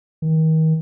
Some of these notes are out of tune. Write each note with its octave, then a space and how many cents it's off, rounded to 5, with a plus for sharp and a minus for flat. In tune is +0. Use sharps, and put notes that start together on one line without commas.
D#3 +35